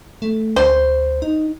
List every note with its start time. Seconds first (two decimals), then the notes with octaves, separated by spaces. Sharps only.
0.22 A3
0.56 D2 C5
1.22 D#4